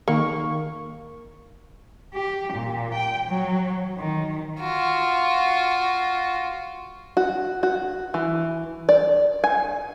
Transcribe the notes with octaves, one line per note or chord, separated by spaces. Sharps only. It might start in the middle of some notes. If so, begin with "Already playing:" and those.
D#3 A#3 C#6
G4
A#2
G5
F#3
D#3
F4 F#4
F#4
F#4
E3
D5
G#5